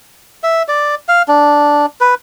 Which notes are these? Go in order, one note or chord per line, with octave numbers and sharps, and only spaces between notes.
E5
D5
F5
D4
B4